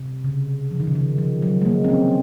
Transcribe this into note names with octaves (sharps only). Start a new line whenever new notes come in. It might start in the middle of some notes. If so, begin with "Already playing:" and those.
Already playing: C3
C#3
F3
D#3
C#3
D#3
F3
F#3
G#3
A#3
C4
C#4